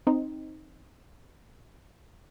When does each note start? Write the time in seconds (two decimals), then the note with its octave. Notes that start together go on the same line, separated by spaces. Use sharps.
0.07 C4 D#4